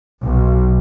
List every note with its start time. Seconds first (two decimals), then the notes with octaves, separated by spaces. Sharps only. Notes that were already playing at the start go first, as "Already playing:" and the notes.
0.23 B1